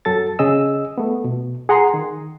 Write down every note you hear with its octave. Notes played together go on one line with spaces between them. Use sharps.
F#2 F#3 A4 A6
C#3 G#4 D#5 E6
A3 B3
B2
G#4 F#5 A#5 C6
D#3